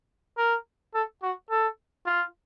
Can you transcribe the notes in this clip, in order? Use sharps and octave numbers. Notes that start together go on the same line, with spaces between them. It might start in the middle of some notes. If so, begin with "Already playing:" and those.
A#4
A4
F#4
A4
F4